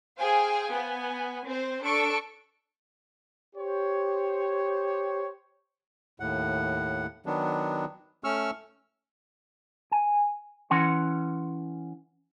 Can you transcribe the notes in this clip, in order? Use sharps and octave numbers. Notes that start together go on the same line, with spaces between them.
G#4 C5 F5 G5 G#5
B3 G#5
C4 C5
D4 A4 C#6 D7
G4 C5 C#5
D#2 A2 F#5
D#3 F#3 B3 D4
A3 C#4 C#6 E6 F6
G#5
E3 C#4 F#5 C6